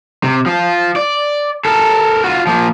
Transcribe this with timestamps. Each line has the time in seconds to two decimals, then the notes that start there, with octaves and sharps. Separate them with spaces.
0.23 C3
0.46 F3 F4
0.96 D5
1.65 A4 A#4
2.24 F4 F#4
2.47 F3 A#3